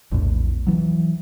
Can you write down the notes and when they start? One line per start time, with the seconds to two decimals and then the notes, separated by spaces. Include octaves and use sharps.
0.12 A#1 E2 A2
0.67 E3 F#3